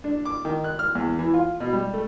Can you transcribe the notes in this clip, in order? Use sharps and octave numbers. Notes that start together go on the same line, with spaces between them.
D4
D6
D#3
F#6
F6
E2
E3
F4
B2
G3
A3